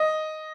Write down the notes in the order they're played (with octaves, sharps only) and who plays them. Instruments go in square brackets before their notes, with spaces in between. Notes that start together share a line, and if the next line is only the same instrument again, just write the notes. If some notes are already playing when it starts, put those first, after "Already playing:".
Already playing: [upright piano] D#5